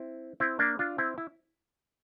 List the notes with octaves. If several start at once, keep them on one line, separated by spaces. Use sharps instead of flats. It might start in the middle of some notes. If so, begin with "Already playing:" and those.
Already playing: C4 E4
C4 E4
A#3 D4
D4 F4
C4 E4
E4